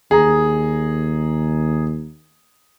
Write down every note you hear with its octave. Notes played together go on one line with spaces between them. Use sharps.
D#2 G#4 A#5